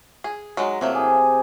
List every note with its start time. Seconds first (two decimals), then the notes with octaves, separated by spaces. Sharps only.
0.24 G#4
0.57 F#3 G#3 D#4
0.81 C3 F#3 A3 A#3
0.95 G#4